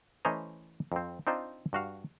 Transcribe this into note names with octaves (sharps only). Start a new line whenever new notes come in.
E3 A3 C#4 C5 D#5 A#5
F2 C4
C4 D4 D#4 F4 C5 D5
G2 F#4 F5